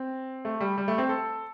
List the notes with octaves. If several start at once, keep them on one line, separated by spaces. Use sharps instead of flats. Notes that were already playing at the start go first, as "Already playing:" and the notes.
Already playing: C4
A3
G3
G3
A3
C4
A4